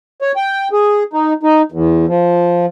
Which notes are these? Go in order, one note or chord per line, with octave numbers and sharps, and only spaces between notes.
C#5
G5
G#4
D#4
D#4
E2
F3